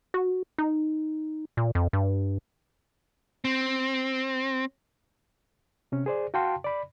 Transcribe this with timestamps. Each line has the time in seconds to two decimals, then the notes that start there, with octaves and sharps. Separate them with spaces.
0.14 F#4
0.58 D#4
1.57 A#2
1.75 F2
1.93 G2
3.45 C4
5.92 C3 C#4
6.06 G#4 C5 D5
6.34 F#4 F5 G5 A5 C6
6.64 D5 B5